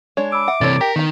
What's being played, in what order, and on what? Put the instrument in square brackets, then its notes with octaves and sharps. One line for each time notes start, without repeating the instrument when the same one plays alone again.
[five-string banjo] G#3 D4 C#5
[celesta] B5 E6 [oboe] D6
[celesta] E5 [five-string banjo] F#5
[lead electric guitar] C3 E3 [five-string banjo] D4 A4 C#5 [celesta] A6
[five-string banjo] G4 [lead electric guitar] A#4 [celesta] B6
[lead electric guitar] D#3 [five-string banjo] B3 A#5